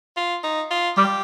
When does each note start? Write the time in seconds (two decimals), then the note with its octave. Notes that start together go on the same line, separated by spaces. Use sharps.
0.17 F4
0.43 D#4
0.71 F4
0.97 G3 G4